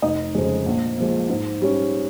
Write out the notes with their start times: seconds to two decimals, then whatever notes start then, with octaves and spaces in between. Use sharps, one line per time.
0.02 F1 D#4 D#5
0.35 F2 C#3 F3 G#3
0.66 A#1
0.97 A#2 F3 G#3
1.29 G#2
1.62 G3 C#4